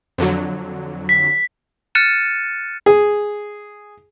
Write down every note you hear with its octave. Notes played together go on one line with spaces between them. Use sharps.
F2 D3 F#3
B6
F6 F#6 A6 C#7 D#7 E7
G#4